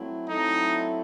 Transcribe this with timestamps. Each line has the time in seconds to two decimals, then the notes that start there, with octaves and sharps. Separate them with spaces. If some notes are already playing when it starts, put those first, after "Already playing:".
Already playing: F#3 A3 C4 E4
0.29 F#3 A3 C4 D#4 E4 A4